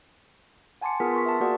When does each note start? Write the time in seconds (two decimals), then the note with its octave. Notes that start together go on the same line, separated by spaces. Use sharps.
0.81 F#5 G#5 A5 C6 D6 C#7
1.00 B3 F4 G#4 A#4 F#5 B6
1.13 C6 C#6 B6
1.26 E5 A5
1.40 A#3 F#4 G#4 A#4 D5 F#5